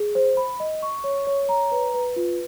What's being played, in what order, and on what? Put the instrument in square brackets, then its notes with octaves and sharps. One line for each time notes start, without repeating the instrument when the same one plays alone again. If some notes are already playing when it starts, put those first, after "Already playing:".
Already playing: [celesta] G#4
C5
B5
D#5
C#6
C#5
C#5
A#5
B4
B4
F4